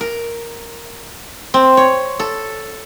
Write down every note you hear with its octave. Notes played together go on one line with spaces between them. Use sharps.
A#4
C4
C#5
A4